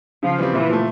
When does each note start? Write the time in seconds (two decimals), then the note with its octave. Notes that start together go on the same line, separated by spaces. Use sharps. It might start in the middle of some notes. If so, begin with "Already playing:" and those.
0.23 C#3 F3
0.38 E3 G3 C4
0.53 A#2 E3
0.70 F3 A3